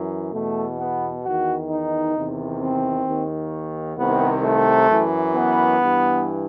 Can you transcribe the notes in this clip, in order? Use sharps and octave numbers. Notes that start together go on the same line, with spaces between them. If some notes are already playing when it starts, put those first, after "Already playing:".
Already playing: F#2 E3
E2 B2 A3
B3
E2 D#3 F#4
D#4
E2 C3 D#3
C4
D#2 D#3
C2 C3 D#3 B3
A3
F#2 E3
B3
G2 E3